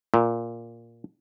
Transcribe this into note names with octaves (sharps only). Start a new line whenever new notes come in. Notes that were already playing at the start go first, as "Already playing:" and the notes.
A#2